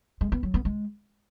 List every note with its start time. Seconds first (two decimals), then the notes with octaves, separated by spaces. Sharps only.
0.21 G#3
0.32 B3
0.43 F#3
0.54 B3
0.65 G#3